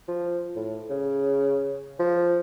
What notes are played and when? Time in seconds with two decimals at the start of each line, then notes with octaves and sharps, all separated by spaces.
0.08 F3
0.56 A2
0.90 C#3
1.99 F3